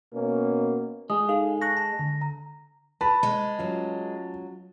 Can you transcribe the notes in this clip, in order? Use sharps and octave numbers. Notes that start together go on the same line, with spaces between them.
B2 A#3 B3 C#4
G#3 D#6
D#4 G#4 A4 F5
A5 C#6 F#6 A#6
A5
D3
A#5
B4 A5
G#3
F#3 C#4 F4